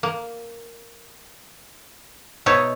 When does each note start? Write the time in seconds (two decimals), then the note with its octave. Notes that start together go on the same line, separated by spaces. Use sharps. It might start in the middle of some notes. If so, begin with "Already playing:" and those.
0.03 A#3
2.46 B2 D#4 C#5 E5